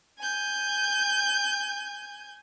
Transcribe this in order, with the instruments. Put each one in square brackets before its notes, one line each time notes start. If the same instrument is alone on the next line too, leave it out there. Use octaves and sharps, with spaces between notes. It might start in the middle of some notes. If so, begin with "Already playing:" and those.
[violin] G#5 G6